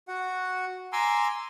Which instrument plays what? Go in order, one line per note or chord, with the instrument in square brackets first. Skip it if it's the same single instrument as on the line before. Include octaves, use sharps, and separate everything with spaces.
[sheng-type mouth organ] F#4 F#5
G#5 A#5 C6 D6 E6